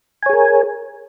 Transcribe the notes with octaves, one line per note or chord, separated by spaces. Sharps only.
G#4 A#4 C#5 G#5